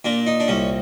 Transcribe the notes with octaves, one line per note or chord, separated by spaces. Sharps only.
A#2 D4
D#4
D4
C2 C#4